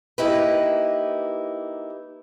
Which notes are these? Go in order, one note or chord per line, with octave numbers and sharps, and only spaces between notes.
A#3 D#4 E4 G4 B4